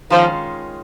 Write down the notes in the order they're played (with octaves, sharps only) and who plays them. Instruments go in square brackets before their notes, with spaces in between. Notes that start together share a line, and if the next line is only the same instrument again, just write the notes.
[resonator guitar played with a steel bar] D#3 G#3 C#4 F4 [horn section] F3